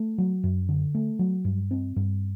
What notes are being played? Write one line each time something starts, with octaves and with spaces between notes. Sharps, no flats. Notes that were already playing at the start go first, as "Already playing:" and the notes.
Already playing: A3
F#3
F#2
D3
A3
F#3
G2
C4
G2